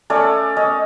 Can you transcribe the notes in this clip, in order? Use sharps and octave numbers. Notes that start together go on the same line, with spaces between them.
A3 C#4 D5
C#4 D#5